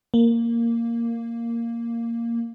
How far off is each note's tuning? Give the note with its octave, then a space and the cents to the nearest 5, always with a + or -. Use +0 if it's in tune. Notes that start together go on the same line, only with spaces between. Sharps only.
A#3 -5